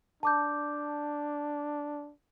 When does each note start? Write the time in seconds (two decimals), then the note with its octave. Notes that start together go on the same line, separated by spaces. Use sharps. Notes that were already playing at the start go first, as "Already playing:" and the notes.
0.23 D4 A5 D6 G6